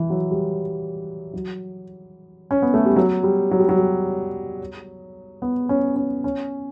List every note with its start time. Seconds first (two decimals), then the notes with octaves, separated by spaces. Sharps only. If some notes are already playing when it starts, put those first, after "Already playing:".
Already playing: E3
0.10 F#3
0.31 G3
1.34 F#3
2.51 C#4
2.62 B3
2.74 A3
2.86 G3
2.96 F#3
3.23 G3
3.51 F#3
3.60 G3
3.69 F#3
3.79 G3
5.42 B3
5.69 C#4
5.96 C#4
6.24 C#4